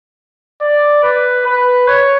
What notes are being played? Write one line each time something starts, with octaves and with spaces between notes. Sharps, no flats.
D5
B4
B4
C#5